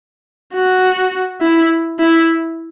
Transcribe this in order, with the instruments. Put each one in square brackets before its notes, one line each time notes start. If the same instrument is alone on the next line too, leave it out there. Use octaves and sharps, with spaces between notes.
[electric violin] F#4
E4
E4